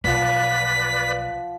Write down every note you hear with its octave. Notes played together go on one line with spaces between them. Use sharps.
B1 F3 B4 D5 F#5 G5 B6